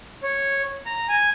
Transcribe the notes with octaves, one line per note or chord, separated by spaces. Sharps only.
C#5
A#5
G#5